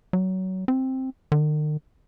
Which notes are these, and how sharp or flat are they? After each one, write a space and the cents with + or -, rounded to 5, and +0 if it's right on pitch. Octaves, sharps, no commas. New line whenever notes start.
F#3 +20
C4 +5
D#3 -45